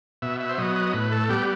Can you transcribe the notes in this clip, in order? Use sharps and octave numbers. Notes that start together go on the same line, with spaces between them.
B2 E5
E5
C5
F#3 B3 D#5
D#5
A2 B4
A4
G3 B3 G4